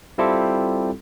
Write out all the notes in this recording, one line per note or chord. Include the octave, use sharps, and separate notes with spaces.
G3 C4 E4 F4 G4 A4